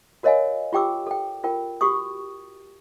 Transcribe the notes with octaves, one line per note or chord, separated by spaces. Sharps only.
F#4 A#4 C#5 D#5 F5 G#5
F4 G4 G5 D6 E6
A4 G5
F4 A#4 G5
F#4 G4 C#6 D#6